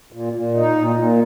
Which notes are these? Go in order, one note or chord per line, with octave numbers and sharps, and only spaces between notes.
A#2
A#2
D#4
A#2
A#2